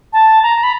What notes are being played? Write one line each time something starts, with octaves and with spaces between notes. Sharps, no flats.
A5
A#5
B5